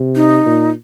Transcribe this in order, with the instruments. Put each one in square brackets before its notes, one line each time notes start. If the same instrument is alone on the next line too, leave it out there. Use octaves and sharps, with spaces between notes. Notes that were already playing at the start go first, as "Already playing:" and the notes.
Already playing: [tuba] C3
[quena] D#4
[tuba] A#2